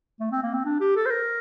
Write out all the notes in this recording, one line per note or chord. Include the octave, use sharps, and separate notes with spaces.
A3
C4
A#3
C4
D4
G4
A4
C5
A#4